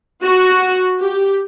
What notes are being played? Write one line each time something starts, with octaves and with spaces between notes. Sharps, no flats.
F#4
G4